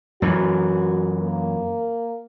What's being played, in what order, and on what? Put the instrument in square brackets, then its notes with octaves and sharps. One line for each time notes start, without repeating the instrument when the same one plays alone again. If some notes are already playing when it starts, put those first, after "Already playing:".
[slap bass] F#2 E3 [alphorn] F#4
[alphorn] A#3